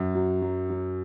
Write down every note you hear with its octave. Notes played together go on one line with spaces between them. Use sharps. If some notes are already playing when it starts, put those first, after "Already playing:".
Already playing: F#2
F#3
F#3
F#3